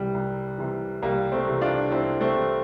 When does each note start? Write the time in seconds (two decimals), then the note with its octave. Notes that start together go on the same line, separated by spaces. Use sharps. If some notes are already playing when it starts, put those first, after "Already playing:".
Already playing: C2 C3 E3 G3
0.14 C2
0.58 C3 E3
1.02 C2 G3 A#3
1.32 A3 C4
1.47 C3 E3
1.61 D4 F4
1.91 C2 C4 E4
2.21 A3 C4
2.36 C3 E3